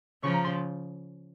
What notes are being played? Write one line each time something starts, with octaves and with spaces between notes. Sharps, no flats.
C#3 F3 C#6
A#5
C6